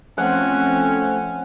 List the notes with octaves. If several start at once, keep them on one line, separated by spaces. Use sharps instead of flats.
F3 A3 C4 C#4 F#5